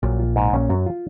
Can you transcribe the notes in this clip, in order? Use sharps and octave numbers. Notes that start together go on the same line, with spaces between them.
A#1 A#2 F#3
F4
G#2
A#1 A#2 C#4
F#2 F#3
F4